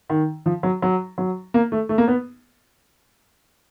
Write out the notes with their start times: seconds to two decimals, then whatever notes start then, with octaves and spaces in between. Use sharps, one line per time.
0.10 D#3
0.46 F3
0.63 F#3
0.82 F#3
1.18 F#3
1.54 A#3
1.72 A3
1.89 A3
1.98 A#3
2.08 B3